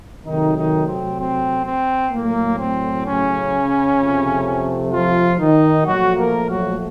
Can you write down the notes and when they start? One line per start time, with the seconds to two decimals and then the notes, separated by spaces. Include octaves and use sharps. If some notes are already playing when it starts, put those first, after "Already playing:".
0.25 C3 D#3 F#3 A3 D#4
0.55 D#3 D#4
0.86 C4
1.18 C4
1.64 C4
2.11 A2 F#3 A3 A#3
2.57 C4
3.04 C#3 C#4
3.97 F2 C3 F3 A3
4.91 F3 F4
5.38 D#3 D#4
5.84 A#2 F3 F#3 A3 F#4
6.16 A#3 A#4
6.47 F#3 F#4